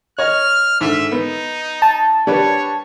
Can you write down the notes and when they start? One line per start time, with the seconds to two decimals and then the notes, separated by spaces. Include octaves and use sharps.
0.19 C#5 D#5 F6
0.81 G#2 D3 E5
1.12 B3 D#4
1.82 A5
2.27 G3 D4 B4 C#5